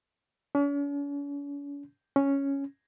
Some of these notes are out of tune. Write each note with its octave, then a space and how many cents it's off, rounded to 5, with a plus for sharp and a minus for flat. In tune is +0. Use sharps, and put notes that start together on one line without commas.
C#4 +45
C#4 +0